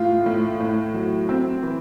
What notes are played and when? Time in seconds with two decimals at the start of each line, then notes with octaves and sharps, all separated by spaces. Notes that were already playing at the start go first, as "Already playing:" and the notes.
Already playing: A2 F4
0.26 A2
0.60 A2
0.94 F#3
1.29 C4
1.63 E3